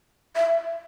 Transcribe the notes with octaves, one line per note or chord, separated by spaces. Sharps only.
E5